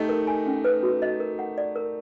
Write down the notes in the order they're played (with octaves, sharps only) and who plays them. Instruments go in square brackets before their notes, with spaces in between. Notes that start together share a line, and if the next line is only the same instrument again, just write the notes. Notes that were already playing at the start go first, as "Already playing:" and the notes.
Already playing: [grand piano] A3 D#4 G4 [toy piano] D#5
[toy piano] A#4
G#5
C#4
B4
F#4
D#5
A#4
F#5
D5
A#4